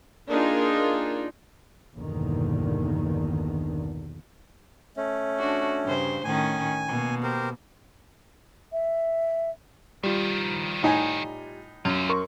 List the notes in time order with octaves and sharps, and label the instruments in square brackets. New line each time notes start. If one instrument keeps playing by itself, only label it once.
[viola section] A#3 D4 D#4 F4 G#4
[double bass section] A#1 E2 G2 B2 D3 D#3
[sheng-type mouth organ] A3 C#4
[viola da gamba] D4 F#4
G2 C#3 C5
[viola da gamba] A2 D#3 C#4 [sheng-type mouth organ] G#5
[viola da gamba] B2 A#3
[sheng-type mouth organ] G4 A#4 C5
[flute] E5
[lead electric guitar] D#3 F3 [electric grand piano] G3 F4
[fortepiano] A2 D#4 G#5
[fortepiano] F#2 [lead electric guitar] C#4 F4
[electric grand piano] A#4 C6 C#6